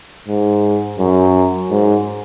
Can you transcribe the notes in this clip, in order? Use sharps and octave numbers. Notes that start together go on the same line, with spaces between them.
G#2
F#2
G#2